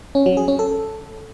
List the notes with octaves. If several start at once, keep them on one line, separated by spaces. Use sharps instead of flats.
C#4
F#3
G#4
C#4
A4